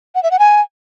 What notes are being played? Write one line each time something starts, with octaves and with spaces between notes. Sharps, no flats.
F#5
E5
F#5
G#5